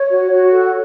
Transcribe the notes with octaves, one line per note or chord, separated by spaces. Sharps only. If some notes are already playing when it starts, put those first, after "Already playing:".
Already playing: C#5
F#4
F#4
A4